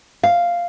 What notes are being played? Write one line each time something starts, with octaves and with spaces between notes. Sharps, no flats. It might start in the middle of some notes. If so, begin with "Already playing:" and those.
F5